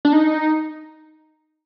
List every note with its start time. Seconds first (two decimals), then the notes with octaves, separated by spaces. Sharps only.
0.05 D4
0.13 D#4